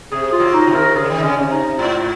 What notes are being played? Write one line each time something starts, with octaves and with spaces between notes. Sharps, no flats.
C3 G#4
F4
F#3 A#3
D#4
C3 D#3
A#4
C#3 G#4
D#3
C#3 C#4
C3
D#4
G#2 F4